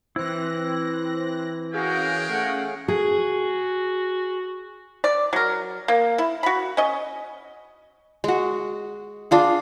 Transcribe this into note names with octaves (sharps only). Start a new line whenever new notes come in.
E3 C4 E4 F#6 A#6
G#3 C#4 F#4 G#4 A#4 F5 G5
A3 F#5
F#4 G#4
D5
F#3 A#4
A#3
E4
F#4 B5
C#4 D#5
G#3 F#4
D4 F4 G#4